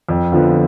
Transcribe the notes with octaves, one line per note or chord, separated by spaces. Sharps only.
F2
D3 F3 B3